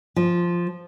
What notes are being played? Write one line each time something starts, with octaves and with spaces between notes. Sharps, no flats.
F3